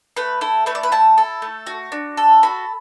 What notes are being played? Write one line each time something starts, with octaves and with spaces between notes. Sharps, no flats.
A3 B4
E4 A4
A3 B4
D5
B4
E4 A5
A4
A3
F#4
D4
A4
F#4 B5